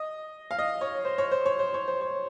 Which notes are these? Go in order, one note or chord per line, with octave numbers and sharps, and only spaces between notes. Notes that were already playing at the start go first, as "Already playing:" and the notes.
Already playing: D#5
F5
D#5
C#5
C5
C#5
C5
C#5
C5
C#5
C5
C#5